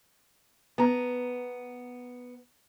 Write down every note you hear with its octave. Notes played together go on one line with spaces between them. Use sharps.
B3 A#5